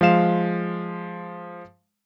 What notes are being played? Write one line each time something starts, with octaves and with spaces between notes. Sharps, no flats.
F3 G#3 F5 E7